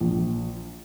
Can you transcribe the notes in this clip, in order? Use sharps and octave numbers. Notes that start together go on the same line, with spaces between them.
A#1